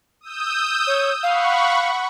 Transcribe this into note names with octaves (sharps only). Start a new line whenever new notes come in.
D#6 E6 G6
C#5
F5 F#5 B5 C#6